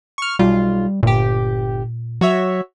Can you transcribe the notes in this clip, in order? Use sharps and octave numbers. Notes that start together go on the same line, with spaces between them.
C#6 F6
B1 G3 F4
G1 A#2 G4
F#3 F#4 C#5 E5